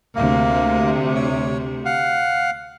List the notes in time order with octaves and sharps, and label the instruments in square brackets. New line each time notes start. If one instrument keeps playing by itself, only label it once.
[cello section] D2 C3 [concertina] A#3
[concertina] C#5
F5 F#5